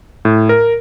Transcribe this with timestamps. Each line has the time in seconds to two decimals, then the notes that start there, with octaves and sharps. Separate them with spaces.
0.25 A2
0.49 A#4